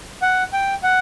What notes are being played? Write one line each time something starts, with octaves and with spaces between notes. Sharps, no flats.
F#5
G5
F#5